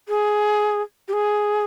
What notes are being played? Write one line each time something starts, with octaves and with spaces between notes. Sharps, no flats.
G#4
G4
G#4